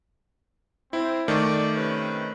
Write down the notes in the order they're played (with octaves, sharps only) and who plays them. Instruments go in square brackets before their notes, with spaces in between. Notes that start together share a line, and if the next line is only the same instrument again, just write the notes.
[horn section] C4 [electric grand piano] E4
[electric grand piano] D#3 A3 [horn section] D5
[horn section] C3 C#4 B4